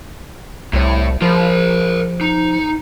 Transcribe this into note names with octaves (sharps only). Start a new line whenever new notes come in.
C2 A2 C#5
F3 A#4 C5
D#4